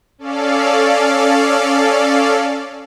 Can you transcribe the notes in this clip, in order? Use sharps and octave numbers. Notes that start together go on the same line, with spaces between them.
C#4 A4 D5 F5